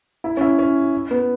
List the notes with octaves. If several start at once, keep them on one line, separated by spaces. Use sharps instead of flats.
E4
C#4
E4
C#4
B3